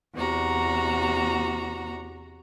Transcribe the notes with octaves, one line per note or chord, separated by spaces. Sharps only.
E2 C3 F#4 A#5